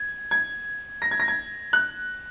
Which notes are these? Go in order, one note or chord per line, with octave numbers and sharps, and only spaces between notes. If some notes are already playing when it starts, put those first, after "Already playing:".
Already playing: G#6
G#6
A#6
G#6
A#6
G#6
F#6